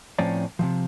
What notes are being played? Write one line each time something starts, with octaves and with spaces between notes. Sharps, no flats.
A2 F3 C4 C#4 D5 A#5
C3 D#3 F3